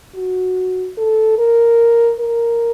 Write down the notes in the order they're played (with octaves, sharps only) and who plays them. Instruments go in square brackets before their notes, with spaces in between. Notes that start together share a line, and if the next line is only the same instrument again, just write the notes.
[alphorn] F#4
A4
A#4
A#4